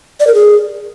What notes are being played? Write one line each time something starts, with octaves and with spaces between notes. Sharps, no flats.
D5
A#4
G#4